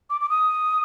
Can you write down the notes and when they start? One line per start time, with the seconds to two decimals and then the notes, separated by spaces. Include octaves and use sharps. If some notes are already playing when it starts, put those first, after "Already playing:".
0.10 D6
0.21 D6
0.30 D#6